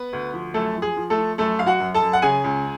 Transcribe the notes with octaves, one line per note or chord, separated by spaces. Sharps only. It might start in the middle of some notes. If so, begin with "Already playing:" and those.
Already playing: B3 B4
D2
F3
F#2 A3 A4
F3
G#4
F3
A3 A4
F3
F#2 A3 A4
F#2 F5
F#4 F#5
F#2
A4 A5
F#2
F#5
C#3 G#4 G#5
C#2